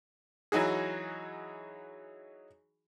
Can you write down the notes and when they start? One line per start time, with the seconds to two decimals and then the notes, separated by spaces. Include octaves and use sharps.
0.52 E3 F#3 D#4 F#4 G#4